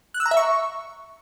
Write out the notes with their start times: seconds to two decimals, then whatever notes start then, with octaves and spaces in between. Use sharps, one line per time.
0.14 F#6
0.20 E6
0.26 A#5
0.31 E5
0.37 C#6